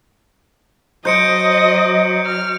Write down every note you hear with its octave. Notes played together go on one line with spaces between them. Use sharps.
F#3 C5 D#5 G6 C#7 D7
F6